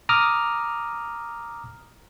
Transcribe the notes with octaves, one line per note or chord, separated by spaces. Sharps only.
A#5 D6 D#6 F6